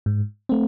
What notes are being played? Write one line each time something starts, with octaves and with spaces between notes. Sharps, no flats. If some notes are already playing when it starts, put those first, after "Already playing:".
G#2
A3 C4